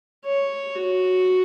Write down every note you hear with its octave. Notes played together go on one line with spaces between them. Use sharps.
C#5
F#4